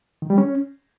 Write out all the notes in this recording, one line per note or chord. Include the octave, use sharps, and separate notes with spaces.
D#3
G3
C#4